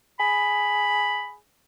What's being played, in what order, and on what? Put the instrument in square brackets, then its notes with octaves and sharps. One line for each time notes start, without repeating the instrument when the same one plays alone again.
[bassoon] G#4 [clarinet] B5